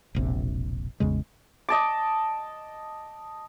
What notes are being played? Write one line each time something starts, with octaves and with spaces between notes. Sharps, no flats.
E1 A#1 C3
A1 E2 C#3 G#3
D#5 A5 D6